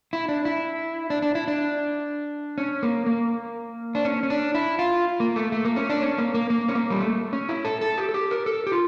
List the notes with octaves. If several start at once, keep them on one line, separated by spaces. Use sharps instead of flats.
E4
D4
E4
D4
D4
E4
D4
C#4
A#3
A#3
D4
C#4
C#4
D4
E4
F4
A#3
A3
A3
A#3
C#4
D4
C#4
A#3
A#3
A#3
C#4
A#3
G3
A3
C#4
E4
A4
A4
G4
A4
G4
A#4
A4
G4
F4